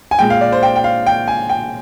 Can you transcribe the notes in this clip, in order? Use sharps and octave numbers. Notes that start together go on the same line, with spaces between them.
G#5
A#2 G#3 G5
F5
D5
C5
G5
G5
F5
G5
G#5
G5